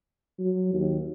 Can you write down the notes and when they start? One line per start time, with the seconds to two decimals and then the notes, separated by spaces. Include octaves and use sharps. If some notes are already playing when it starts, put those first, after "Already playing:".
0.39 F#3
0.73 D#2